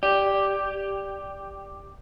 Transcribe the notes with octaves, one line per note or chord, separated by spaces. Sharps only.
G4 D5